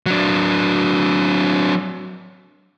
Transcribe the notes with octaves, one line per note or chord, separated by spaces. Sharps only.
F#3 D4